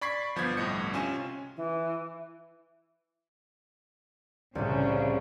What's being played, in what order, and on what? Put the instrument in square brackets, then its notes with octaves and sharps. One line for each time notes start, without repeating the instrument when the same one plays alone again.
[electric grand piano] D5 B5 C#6 G#6 B6 C7
G1 F3 B3 G6 G#6
G1 C2 A2 D#5 C#7
C3 C#4 F4 G#5 E7
[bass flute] E3
[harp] C2 A2 [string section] C#3